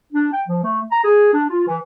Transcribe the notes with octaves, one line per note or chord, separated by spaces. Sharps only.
D4
G5
F3
A3
A#5
G#4
D4
F4
E3